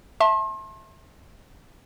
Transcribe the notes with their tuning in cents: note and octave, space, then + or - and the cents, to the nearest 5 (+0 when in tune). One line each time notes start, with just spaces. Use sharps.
E5 -15 A5 +0 C6 +40